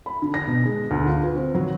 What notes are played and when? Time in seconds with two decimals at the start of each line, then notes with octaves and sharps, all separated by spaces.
0.06 B5
0.22 D3
0.34 A#6
0.47 B2
0.65 G#3
0.91 D2
1.07 F4
1.23 B4
1.35 C4
1.54 F#3